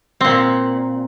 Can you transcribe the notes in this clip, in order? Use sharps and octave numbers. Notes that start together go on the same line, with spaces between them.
A#2 C4